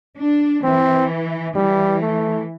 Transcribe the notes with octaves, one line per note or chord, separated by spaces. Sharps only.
D4
E3 C4
E3 G3
A3